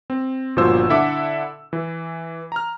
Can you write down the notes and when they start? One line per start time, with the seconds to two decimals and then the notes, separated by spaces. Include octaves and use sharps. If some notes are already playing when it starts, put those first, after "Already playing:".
0.10 C4
0.56 G1 A#2 F3 F#4 C5 E6
0.89 D3 E4 A4 E5 F#5 D6
1.73 E3
2.52 A#5 F6